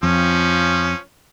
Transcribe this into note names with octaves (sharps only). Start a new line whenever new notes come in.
F2 F3 C#4